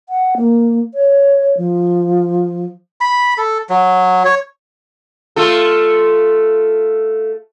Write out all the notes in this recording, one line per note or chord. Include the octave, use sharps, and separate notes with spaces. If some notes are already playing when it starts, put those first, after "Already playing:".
F#5
A#3
C#5
F3
B5
A4
F#3
C#5
A3 F4 A4